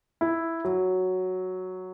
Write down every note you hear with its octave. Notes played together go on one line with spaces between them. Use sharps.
E4
F#3